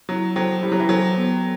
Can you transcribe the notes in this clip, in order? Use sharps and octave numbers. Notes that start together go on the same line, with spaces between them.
F#3 E4
F#3 A4 C5 G5
G3 E4
F#3
E3
F#3 A4 C5 G5
B3